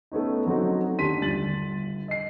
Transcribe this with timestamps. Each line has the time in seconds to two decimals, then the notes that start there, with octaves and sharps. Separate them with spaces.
0.12 A3 B3 C#4 D#4
0.46 F#3 A3 C4 C#4 D#4 F#4
0.99 D#2 D4 G4 C6 B6 D#7
1.22 G1 A6 F#7
2.08 D#5 C7